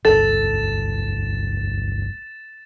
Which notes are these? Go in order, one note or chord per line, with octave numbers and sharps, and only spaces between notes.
G1 C#2 A4 A6 E7